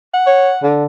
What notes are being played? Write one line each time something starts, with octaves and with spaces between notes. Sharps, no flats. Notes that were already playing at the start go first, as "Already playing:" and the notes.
F#5
C#5
D3